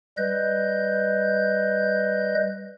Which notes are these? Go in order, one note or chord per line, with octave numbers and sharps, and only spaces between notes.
G3 B4 D#5 G6